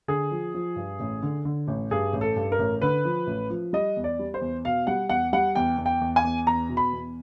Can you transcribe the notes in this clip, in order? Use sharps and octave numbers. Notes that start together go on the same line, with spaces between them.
D3 G#4
F3
F3
G2
A1
D3
D3
A1
G2 G#4
A1
A4
G2
A#4
A1
D3 B4
F3
A1
F3
G3 D#5
E2
D5
G3
C5
E2
B2 F5
G3 F#5
E2 F#5
G3 F#5
E2 G5
E2
G5
E2
G#5
E2
E2 A#5
B2
B5
E2